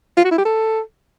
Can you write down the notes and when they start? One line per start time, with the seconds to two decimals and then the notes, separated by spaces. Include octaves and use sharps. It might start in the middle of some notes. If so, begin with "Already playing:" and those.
0.17 F4
0.24 F#4
0.31 E4
0.38 G4
0.45 A4